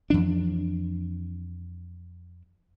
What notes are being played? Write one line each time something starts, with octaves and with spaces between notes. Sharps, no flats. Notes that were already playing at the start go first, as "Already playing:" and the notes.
F2 E3 D4